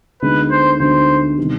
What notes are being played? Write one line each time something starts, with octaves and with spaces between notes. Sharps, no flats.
D2 D3 G#3 B3 D#4 B4
C5
D2 D3 G#3 B3 D#4 C5
C3 D#3 G3 B3